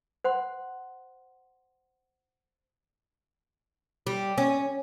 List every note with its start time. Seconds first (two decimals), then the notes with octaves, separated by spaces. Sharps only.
0.24 C5 F#5 C6
4.07 G3
4.38 C#4